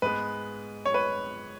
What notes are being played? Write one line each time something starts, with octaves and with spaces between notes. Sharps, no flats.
G#2 G#3 B3 B4
C#5
B4